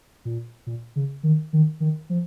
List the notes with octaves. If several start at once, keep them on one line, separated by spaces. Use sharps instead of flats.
A#2
A#2
C#3
D#3
D#3
D#3
F3